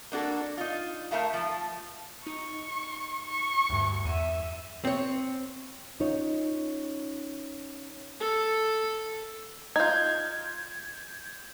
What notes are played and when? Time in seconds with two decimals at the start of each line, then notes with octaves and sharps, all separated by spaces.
0.12 A#3 D4 F#4 A4
0.57 D#4 F4
1.11 A3 D#4 A#4 E5 F5 A5
1.33 F3 A3
2.27 D#4 C#6
3.27 C#6
3.69 D2 G2
4.05 E2 E5 D#7
4.85 C4 C#5
6.00 C#4 D#4 F4 C#5
8.20 A4
9.76 D#4 F4 G6 G#6